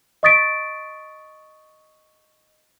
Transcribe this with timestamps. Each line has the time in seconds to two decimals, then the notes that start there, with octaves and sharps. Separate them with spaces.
0.23 D#5 C#6 D#6 A6 B6 D7